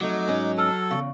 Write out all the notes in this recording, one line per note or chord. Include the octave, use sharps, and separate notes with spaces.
F2 F#3 A3 D#4 D6
G#2 C#4
A4 A5 E6 F6
E2 C#3 F5 C#6